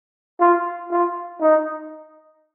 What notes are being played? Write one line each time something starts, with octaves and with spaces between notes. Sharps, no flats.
F4
F4
D#4